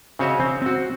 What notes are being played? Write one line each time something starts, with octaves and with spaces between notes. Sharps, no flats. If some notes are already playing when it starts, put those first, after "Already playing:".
C#3 C4 F#4 C#5 D#5 E5
C4
C4 F#4